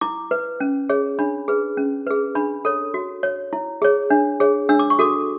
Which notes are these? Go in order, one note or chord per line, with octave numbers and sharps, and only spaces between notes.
E4 D6
B4
C#4
G#4 C#5
D4 B5
G#4 B4
C#4
G#4 B4
D4 B5
A4 C#5
F#4
C#5
E4
G#4 C#5
D4
G#4 C#5
D4 E6
D6
C#6
F#4 A4 D6